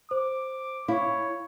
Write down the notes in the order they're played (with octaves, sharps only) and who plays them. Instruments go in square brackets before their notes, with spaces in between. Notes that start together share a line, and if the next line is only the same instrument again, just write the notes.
[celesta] C5 [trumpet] D6
[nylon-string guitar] E4 [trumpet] C#5 [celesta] F5 C#6